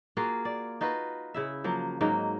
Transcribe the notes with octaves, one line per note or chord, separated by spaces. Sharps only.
A#3 F4 F#4 G#4
D5
D#4 F4 F#4 B4
C#3 E4 E5
F3 F#3 A#3
G#2 F#3 A#3 D#4